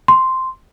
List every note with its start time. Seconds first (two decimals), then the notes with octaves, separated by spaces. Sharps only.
0.08 C6